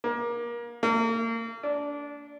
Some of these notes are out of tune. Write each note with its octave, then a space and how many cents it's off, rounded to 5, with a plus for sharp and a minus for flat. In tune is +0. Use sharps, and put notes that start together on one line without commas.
A#3 +25
A#3 -35
D4 -20